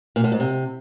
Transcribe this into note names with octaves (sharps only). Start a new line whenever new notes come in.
A#2
A2
G#2
C3